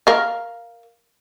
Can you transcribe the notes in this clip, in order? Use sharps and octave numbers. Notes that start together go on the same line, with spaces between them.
A#4 F5